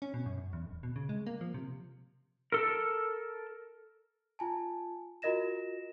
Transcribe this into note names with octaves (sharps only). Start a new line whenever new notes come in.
C#4
B2
F#2
F#2
E2
D1
B2
C#3
G#3
A#3
F3
C3
A4 A#4
F4 G#5 A5
F4 F#4 A#4 D#5 A#6 E7